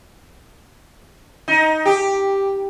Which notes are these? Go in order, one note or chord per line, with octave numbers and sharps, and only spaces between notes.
D#4
G4